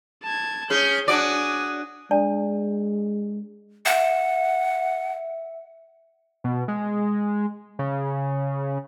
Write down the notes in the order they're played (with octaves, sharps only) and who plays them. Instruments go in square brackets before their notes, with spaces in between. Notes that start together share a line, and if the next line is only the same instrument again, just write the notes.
[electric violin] A5 G#6
[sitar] C#4 G#4 [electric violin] G6
[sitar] D4 F#4 D5 [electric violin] G#5 D#6
[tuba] G#3 [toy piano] D4 D5 A5
[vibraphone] E5 [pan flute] F#5
[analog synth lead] B2
G#3
C#3